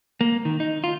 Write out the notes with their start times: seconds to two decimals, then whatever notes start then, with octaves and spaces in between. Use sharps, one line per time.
0.21 A#3
0.45 D#3
0.60 D#4
0.84 F4